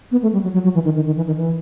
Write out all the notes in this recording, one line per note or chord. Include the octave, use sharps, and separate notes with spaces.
B3
A3
G3
F#3
F#3
F#3
E3
D#3
D#3
D#3
E3
D#3
E3